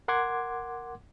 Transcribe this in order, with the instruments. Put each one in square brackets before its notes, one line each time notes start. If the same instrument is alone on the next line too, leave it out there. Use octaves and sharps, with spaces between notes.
[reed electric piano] A#4 F#5 C6 D6 G#6